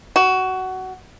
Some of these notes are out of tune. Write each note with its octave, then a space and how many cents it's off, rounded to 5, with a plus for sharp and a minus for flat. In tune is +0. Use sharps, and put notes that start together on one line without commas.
F#4 +15